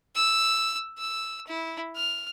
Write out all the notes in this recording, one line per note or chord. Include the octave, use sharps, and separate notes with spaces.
E6
E6
E4
F6